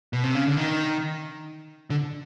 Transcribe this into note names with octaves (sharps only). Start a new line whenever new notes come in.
B2
C3
C#3
D3
D#3
D3